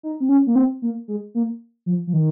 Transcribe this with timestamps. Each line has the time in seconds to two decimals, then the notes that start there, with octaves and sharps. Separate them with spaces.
0.03 D#4
0.20 C4
0.29 C#4
0.47 A#3
0.56 C4
0.82 A#3
1.08 G#3
1.35 A#3
1.86 F3
2.07 F3
2.13 D#3